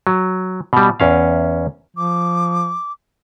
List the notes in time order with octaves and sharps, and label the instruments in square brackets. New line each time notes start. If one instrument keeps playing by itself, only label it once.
[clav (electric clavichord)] F#3
B2 G3
E2 C#4 F5
[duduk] F3 [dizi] D6